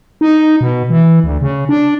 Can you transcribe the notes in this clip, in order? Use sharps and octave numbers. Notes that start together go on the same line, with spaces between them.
D#4
B2
E3
D2
C#3
D4